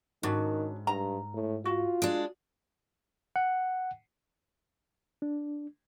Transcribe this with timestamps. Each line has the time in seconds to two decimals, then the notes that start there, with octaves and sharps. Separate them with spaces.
0.23 G#2 D#3 C#4 D4 F#4
0.87 G2 A#5
1.34 A2
1.65 F4 F#4
2.02 G#3 D4
3.36 F#5
5.22 D4